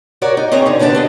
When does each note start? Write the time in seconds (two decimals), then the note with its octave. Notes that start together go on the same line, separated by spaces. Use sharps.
0.22 F#4 G4 A#4 C#5 D5
0.37 D#4
0.52 C4 C#4 D#4 G#4 C#5 D#5
0.66 D3 G#4
0.79 D3 B3 D4 G4 A5
0.95 D4 A4 D#5